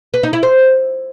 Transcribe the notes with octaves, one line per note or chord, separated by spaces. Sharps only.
B4
D#4
E4
C5